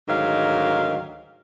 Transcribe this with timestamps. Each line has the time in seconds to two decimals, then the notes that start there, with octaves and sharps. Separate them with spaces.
0.08 D2 G#2 D#3 F#3 A#4 F5